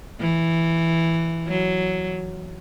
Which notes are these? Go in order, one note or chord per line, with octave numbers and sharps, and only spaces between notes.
E3
F#3